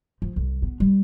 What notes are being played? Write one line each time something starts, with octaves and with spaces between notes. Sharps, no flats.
F3
C2
B3
G3